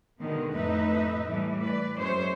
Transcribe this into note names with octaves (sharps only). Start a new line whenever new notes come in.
B2 D3 D#3 G#3 B3
F2 A2 A3 D#4 B4 E5
A2 E3 G3 A3
B4 D5
F#2 G#3 C#4 C5 C#5